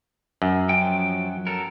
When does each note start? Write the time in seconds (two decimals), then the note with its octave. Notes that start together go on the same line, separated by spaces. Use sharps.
0.42 F#2
0.69 F3 F#3 G5
1.47 F#3 A4 A#4